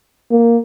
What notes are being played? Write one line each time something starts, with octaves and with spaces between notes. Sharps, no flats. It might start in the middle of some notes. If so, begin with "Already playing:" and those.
A#3